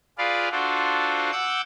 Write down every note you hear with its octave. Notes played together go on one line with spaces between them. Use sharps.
F4 G#4 B4 D5 F5
D4 F4 F#4 A4 C5
F#5 D6 E6 G6